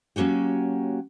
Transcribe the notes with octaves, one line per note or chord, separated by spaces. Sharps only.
F#3 A#3 C#4 F#4 G4